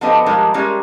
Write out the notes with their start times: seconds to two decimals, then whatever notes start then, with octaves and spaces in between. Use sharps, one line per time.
0.01 F3 B3 C4 D4 A4 D#5
0.26 F3 G3 G#3 D4 D#4 A#4
0.54 E3 G3 G#3 C#4 A#4